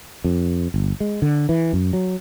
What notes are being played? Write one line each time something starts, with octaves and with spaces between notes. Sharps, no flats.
F2
G1
G#3
D3
E3
F#2
F#3